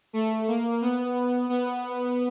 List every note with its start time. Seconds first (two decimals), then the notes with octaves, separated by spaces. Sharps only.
0.13 A3
0.48 A#3
0.82 B3
1.49 B3